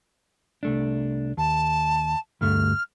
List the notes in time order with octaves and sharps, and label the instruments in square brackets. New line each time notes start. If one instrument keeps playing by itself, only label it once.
[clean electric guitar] C2 A3 D4
[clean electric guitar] D#2 [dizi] A5
[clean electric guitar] D2 G2 A3 [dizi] F6